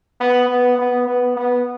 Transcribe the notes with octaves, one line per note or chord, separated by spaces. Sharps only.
B3
B3
B3
B3
B3